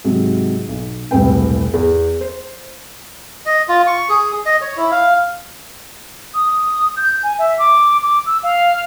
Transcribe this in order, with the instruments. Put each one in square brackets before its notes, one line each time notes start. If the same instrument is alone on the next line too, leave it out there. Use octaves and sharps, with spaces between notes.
[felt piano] G#2 C3 F#3
B1
E1 C2 A2 C3 B4 G5
E2
C5
[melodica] D#5
F4
C#6
G#4
D#5
C#5
E4
F5
[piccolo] D#6
G6
G#5
E5
D6
D6
E6
F5